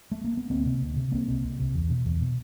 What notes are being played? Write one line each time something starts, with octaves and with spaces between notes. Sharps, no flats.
A3
A#3
B3
D2 A#3 C4
C3
D2
C3
C2 A#3 C4
C3
C2
C3
E2
B2
E2
B2